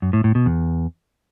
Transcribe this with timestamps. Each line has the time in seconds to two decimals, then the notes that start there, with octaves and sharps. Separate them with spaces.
0.02 F#2
0.13 A2
0.24 A2
0.35 B2
0.46 E2